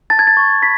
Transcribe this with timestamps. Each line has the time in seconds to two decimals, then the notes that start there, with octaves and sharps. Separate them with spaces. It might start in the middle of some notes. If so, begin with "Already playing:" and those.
0.10 A5 A6
0.19 G#6
0.27 A6
0.37 C#6
0.62 B5 B6